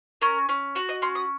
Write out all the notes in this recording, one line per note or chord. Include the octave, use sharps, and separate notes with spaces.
C#4 A#4
C#4
F#4 C#5
D#5
C#4 C6
D#6